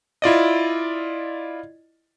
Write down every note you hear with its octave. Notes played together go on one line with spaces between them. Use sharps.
E4 F4 D5 D#5